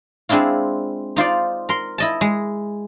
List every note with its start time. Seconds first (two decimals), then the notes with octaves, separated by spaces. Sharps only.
0.29 G#3 C4 D4 E4 F4
1.16 D#4 F4 C5 D5
1.69 A#4 C6
1.98 E4 D#5 A5
2.21 G#3